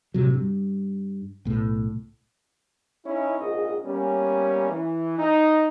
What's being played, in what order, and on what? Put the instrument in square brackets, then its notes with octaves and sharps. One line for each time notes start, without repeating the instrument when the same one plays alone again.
[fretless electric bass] A2 C3 F#3
G2
B1 A2
[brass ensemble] C#4 D#4 E4
A#1 G#2 D#5
G3 A#3 B3 C#4
E3
D#4